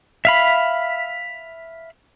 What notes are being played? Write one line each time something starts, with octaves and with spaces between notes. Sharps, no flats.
E5 F5 B5